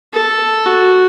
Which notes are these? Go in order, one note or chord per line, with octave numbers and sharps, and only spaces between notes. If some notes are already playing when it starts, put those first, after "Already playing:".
A4
F#4